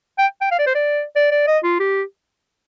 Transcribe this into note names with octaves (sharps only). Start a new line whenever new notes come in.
G5
G5
F5
D5
C5
D5
D5
D5
D#5
F4
G4